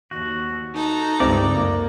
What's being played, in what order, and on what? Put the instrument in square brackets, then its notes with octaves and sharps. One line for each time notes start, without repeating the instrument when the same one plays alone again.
[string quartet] D#2 [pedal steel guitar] F#4
[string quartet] D#4 A4 A#5
[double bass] C#2 G2 [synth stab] C3 [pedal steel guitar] D5 D6
[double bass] F#2 A#3